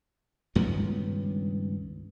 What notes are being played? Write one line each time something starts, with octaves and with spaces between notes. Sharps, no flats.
C#2 G2 D#3 B3